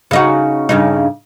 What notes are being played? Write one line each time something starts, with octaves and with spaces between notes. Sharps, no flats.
C#3 D#4 F#4
G2 C#3 D#4